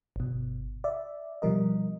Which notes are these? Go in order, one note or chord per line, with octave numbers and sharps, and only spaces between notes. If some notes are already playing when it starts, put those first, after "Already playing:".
G1 B2
D5 E5
B2 F3 G3 A#4 D#5